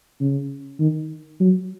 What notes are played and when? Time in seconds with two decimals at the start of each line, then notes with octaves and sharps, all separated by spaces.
0.20 C#3
0.79 D#3
1.40 F#3